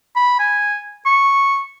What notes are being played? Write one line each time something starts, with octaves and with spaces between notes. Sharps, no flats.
B5
G#5
C#6